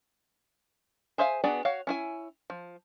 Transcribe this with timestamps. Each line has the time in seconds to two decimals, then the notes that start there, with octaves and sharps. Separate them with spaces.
1.18 G#4 C5 E5 F5 G#5
1.44 B3 D4 F#4 G#4 D5
1.65 F#4 C#5 F5
1.87 C#4 E4 G#5
2.50 F3